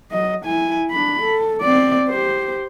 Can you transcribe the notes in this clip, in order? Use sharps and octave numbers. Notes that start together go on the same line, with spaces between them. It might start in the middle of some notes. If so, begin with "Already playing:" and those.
F#3 D#5
E4 G#5
D4 B5
A4
C4 D5
G4 C5